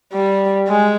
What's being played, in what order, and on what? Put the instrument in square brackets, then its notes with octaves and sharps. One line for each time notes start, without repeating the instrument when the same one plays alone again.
[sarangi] G3
G#3